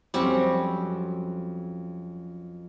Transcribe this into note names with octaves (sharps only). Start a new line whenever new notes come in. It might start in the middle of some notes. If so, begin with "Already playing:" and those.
F2 F#3 G3 C4 C#4 F#4